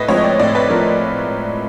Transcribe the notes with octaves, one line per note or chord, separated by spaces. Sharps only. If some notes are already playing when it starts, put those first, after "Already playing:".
Already playing: A2 B4 D#5
F3 G#3 C4 C#5
D#5
D5
A2 D5
B4
F3 A#4